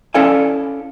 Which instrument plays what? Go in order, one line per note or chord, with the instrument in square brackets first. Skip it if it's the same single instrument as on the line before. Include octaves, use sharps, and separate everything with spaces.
[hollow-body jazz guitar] C#4 E4 A4 D5 F5 G#5